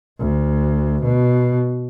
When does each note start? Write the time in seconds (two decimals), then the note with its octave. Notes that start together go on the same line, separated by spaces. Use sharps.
0.19 D2
1.03 B2